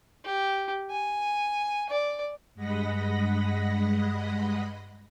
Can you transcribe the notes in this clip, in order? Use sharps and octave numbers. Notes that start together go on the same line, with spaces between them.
G4
G#5
D5
G2 G#3 D#5 F#5 B5 A#6